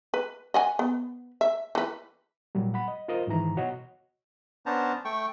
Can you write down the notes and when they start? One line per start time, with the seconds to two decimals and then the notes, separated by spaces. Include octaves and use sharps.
0.14 B4
0.54 D#5 F#5 G#5
0.79 B3
1.41 E5
1.75 E3 B4
2.55 A#2 F#3 G3
2.74 F#5 B5
2.88 D#5
3.08 F4 A#4 C5 D#5
3.27 G#2 D#3 E3 A#5
3.57 B2 F#4 C#5 D#5 F#5
4.66 B3 C#4 D4 C5 A5 A#5
5.05 A3 G5 C#6